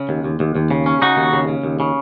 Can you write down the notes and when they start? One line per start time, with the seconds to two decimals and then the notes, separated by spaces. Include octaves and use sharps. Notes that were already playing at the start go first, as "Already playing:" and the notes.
Already playing: C#3
0.09 D#2
0.24 D#2
0.40 D#2
0.55 D#2
0.71 C#3
0.86 C#4
1.02 C#3 D#4 F#4
1.17 D#2
1.33 C#3
1.48 C#3
1.64 D#2
1.80 C#3